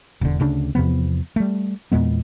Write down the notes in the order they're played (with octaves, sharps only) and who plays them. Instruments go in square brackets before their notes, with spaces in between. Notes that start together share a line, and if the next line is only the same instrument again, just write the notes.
[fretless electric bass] E1 D3
D2 C#3 D4
E2 C3 F3 B3
G3 A3
E2 A#2 G#3 B3